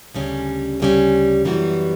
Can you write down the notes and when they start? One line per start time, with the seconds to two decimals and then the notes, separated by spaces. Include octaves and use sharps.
0.14 D2 C#3 G3 C#4
0.80 D2 C#3 G3 C#4
1.45 F#2 E3 G3 B3 F#4